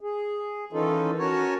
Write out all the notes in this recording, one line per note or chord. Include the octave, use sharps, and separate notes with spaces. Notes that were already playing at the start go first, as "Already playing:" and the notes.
G#4
D#3 E3 C#4 D#4 F4 A4
C#4 F#4 A#4 C#5 G#5 A5